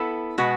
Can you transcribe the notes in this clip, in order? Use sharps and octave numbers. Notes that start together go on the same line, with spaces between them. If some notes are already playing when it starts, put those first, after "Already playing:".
Already playing: B3 E4 A4
B2 G#3 B3 F#4